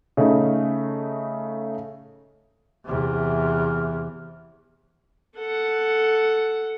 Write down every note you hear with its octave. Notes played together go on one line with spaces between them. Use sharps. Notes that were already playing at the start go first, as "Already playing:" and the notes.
C#3 A3 D#4
E2 C3
A4 F#5